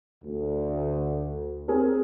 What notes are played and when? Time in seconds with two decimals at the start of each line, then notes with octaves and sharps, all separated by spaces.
0.24 D2
1.68 C4 G#4 A#4